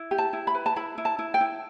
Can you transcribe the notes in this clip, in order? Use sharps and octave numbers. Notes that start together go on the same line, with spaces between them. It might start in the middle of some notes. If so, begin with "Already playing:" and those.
Already playing: E4
G4
A5
E4
B5
B4
A5
E4 B5
E4
A5
E4
G5
E4